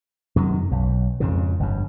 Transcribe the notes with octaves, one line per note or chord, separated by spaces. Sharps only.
F#2 C3 D#3
B1
F2 G#2 C#3
G1 G2